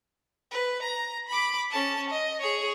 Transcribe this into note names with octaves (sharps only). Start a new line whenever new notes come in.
B4
A#5
B5 D6
C#4 A5
D#5
G#4 C#5